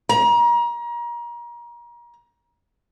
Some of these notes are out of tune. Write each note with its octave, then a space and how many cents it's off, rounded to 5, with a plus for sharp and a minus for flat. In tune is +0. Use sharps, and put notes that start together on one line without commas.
A#5 +30